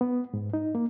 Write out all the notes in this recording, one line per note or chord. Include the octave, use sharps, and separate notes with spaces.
B3
G#2
D#4
A#3